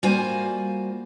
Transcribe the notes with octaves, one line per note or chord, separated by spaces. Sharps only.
G3 A#3 F4 F#4 C5 G#5